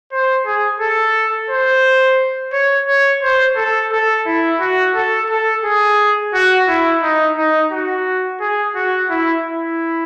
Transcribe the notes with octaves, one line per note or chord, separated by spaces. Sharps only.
C5
G#4
A4
C5
C#5
C#5
C5
A4
A4
E4
F#4
A4
A4
G#4
F#4
E4
D#4
D#4
F#4
G#4
F#4
E4
E4